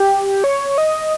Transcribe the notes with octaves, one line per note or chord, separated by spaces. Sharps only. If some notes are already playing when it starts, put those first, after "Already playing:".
Already playing: G4
C#5
D#5